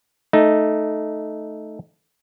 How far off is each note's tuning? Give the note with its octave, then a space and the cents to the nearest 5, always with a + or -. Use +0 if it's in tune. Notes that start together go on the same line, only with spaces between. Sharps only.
A3 -5 D#4 -5